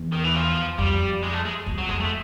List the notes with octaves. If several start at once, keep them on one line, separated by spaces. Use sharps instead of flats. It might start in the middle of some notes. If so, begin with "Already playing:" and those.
Already playing: E2
D#3
E3
F3
F2 G3
G#3
A3
G#3
F2
F#3
F2 G#3
A3